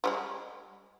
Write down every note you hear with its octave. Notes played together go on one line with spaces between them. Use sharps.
F3 G3 G#3